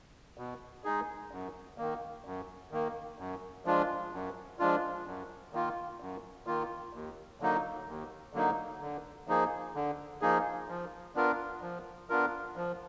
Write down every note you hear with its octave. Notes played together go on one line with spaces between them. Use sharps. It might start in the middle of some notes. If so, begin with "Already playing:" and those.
B2
G#3 D#4 G#4
F#2
D#3 A#3
F#2
D#3 A#3
F#2
F3 G#3 D4 F4
F#2
F3 G#3 D4 F4
F#2
D#3 A#3 F4
F#2
D#3 A#3 F4
D#2
D3 F#3 A#3 D#4
D#2
D3 F#3 A#3 D#4
D3
F3 A#3 D#4 G#4
D3
F3 A#3 D#4 G#4
F3
B3 D4 F4 A#4
F3
B3 D4 F4 A#4
F3